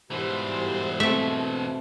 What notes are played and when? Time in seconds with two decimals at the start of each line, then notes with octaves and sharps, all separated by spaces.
0.11 G#2 B2 E3 G3 C5
1.00 A3 C4 E5